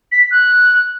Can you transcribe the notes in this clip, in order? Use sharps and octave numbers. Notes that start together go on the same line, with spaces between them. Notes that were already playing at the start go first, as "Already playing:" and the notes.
B6
F#6